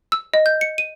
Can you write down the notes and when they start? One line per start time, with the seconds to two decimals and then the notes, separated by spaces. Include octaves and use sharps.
0.12 E6
0.34 D#5
0.46 G6
0.61 C#7
0.78 D#7